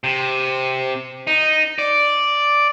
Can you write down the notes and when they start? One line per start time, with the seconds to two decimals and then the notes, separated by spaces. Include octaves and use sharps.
0.04 C3
1.27 D#4
1.78 D5